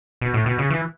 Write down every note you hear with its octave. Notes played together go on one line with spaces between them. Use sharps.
B2
A2
B2
C#3
E3